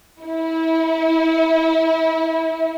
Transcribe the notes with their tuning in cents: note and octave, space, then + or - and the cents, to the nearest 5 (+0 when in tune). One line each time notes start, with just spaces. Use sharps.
E4 -25